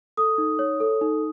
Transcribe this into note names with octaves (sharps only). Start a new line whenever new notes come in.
A4 D#6
D#4
C#5
A4
D#4